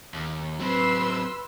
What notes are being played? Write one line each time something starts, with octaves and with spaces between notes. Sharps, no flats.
D#2
F#3 C4 B4 C6 E6